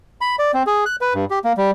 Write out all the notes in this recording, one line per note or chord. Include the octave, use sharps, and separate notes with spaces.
B5
D5
C4
G#4
F#6
B4
G2
G4
A#3
G3